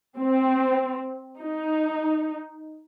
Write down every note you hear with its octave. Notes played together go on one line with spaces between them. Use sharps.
C4
D#4